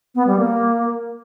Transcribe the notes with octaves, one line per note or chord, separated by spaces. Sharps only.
B3
G3
A#3